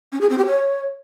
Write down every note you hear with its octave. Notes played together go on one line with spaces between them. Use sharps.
C#4
G#4
C4
G4
C#5